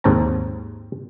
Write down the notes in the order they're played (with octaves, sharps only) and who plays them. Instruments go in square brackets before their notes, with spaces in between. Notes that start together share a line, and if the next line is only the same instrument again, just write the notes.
[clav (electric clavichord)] D#2 G#2 C4 C#5 A5 A#5